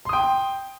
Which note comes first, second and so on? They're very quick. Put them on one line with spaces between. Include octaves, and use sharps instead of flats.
C6 D#6 G5